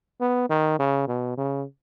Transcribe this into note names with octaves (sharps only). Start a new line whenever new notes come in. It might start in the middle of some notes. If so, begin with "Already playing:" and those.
B3
D#3
C#3
B2
C#3